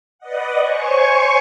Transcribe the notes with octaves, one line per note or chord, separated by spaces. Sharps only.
B4 D5 D#5 F#5
C5 C#5 G#5 C#6